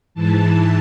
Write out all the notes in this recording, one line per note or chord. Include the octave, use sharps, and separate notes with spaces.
G#2 E3 A5